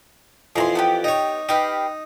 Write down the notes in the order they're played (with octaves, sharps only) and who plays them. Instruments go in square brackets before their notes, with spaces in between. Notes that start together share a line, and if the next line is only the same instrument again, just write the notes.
[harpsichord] F2 E3 [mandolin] G#4 A#5 C6
[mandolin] B3 D4 G4
[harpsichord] D#4 C#5
[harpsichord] D#4 [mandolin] G4 B4 F5